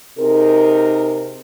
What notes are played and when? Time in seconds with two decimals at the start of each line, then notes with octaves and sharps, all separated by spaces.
0.19 C3 D#4 G#4 A#4